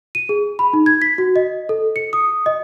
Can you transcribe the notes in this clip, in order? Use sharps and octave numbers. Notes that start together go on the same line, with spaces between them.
D#7
G#4
B5
D#4
G#6
B6
F#4
D#5
A4
C#7
D#6
D#5